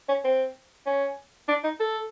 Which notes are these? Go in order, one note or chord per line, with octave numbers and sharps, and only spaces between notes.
C#4
C4
C#4
D4
D#4
A4